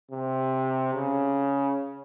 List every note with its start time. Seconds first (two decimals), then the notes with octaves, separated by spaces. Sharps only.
0.11 C3
0.94 C#3